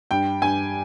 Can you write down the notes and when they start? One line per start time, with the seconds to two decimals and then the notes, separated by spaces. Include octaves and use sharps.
0.11 G2 G5
0.42 G2 G#5